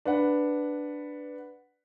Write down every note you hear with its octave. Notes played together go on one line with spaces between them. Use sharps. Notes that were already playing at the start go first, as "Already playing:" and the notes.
D4 B4 F#5